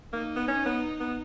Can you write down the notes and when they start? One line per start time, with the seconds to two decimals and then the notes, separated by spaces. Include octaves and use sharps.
0.13 A#3 D#4
0.36 B3
0.48 C#4
0.65 B3
1.00 B3